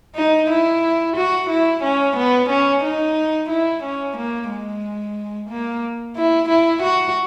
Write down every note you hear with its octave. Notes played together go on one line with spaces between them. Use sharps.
D#4
E4
F#4
E4
C#4
B3
C#4
D#4
E4
C#4
A#3
G#3
A#3
E4
E4
F#4